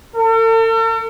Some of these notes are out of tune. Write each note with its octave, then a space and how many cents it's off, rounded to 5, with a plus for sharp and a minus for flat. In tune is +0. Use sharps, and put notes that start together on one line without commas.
A4 +45